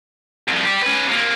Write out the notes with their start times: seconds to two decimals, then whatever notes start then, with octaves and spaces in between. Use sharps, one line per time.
0.48 C2 F3
0.65 G4 D5
0.82 C#4 B4
1.07 C3 A#3